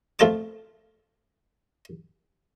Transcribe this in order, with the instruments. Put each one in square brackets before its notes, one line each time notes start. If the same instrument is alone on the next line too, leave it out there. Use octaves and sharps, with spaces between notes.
[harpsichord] F2 A3 F4 A5 D6